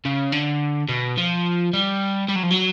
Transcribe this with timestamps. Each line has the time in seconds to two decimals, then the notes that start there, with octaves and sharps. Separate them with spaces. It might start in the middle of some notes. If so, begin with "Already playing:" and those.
0.05 C#3
0.32 D3
0.89 B2
1.17 F3
1.74 G3
2.28 G3
2.36 F#3
2.43 F3
2.50 F#3